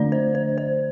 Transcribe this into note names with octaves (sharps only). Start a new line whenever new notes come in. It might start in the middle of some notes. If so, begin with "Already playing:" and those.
Already playing: D3 A3 D4 D5
C5
C5
C5